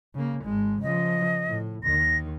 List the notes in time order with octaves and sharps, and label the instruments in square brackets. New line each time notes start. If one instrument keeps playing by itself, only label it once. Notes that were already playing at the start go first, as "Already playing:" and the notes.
[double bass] C#3 A#3
G#1 G#3
[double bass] C#3 F3 [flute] D#5
[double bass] A2
[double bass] D#2 D#3 [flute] A#6